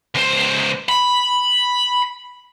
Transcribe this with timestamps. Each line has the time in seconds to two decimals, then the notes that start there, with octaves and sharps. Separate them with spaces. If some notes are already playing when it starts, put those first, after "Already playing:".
0.15 C#2 C5
0.89 B5